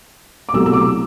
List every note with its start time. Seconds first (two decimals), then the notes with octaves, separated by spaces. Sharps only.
0.49 D6
0.53 C2 B2 F#3 A3 E6
0.66 E6
0.73 D6